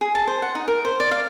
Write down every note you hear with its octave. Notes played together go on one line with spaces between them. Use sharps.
G#4
A5
C5
F#5
D#4
A#4
C5
D5
F5